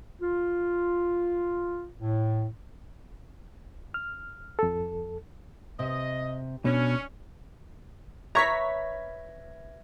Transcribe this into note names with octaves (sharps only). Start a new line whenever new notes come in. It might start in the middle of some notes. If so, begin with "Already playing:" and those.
F4
A2
F6
F2 A4
C3 D#5
B2 C#4 D4
B4 C#5 E5 A#5 C#6 G#6 A#6 B6